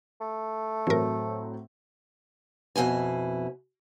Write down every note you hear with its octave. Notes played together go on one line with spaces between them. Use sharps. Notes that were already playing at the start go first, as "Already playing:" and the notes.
A3
A2 E3 F#3 C4 A#4
F2 B2 E4 G#5